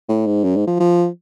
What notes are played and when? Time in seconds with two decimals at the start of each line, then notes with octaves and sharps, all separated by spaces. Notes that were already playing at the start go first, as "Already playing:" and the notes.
0.09 A2
0.26 G#2
0.44 F#2
0.56 G#2
0.67 F3
0.80 F3